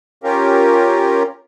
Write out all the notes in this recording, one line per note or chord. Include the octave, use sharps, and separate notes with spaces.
C#4 F4 G4 A#4